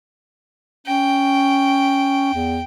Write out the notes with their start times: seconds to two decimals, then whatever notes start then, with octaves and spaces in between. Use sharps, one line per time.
0.87 C#4 G5
2.34 E2